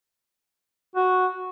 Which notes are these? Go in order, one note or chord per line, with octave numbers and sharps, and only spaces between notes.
F#4